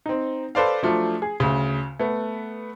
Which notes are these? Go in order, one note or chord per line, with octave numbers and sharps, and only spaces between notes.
C4 D#4
A4 B4 C5 D5 F5
F3 F#3 A3 D4 F4
G#4
D2 C#3
A3 B3